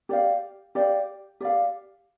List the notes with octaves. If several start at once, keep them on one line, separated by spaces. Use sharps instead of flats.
G4 D5 F5
G4 D5 F5
G4 D5 F5